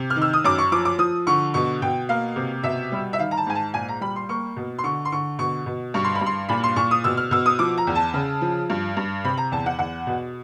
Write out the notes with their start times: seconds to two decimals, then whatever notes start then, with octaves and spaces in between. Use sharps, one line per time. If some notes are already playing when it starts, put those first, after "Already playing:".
Already playing: C3
0.10 F6
0.16 D#3
0.22 E6
0.33 D#6
0.44 F#2 D6
0.58 C#6
0.72 F3 D6
0.85 D6
0.98 F3 D#6
1.27 D3 C#6
1.54 B2 C#6
1.82 B2 G5
2.09 A#3 F5
2.36 C3
2.64 B2 E5
2.92 G3
3.13 E5
3.19 D#3 F5
3.31 A#5
3.37 A5
3.47 G#2 G#5
3.55 A5
3.74 A#2 G#5
3.88 A#5
4.01 G3 B5
4.16 C6
4.29 A#3 C#6
4.57 B2
4.78 C6
4.84 D3 C#6
5.05 C6
5.12 D3 C#6
5.39 B2 C#6
5.66 B2
5.94 G2 C#6
6.04 C6
6.15 B5
6.21 G2
6.26 C6
6.49 A#2 B5
6.63 C6
6.76 A#2 C#6
6.91 D#6
7.04 B2 E6
7.17 F6
7.31 B2 E6
7.46 D#6
7.59 F3 D6
7.78 A#5
7.87 E2
7.95 A5
8.14 C#3
8.41 F3
8.70 G2
8.97 G2
9.24 C3 B5
9.37 A#5
9.52 E2 A5
9.66 F#5
9.79 E2 F#5
10.07 B2